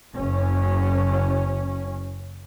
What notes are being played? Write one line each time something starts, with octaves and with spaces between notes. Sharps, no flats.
F#1 C#4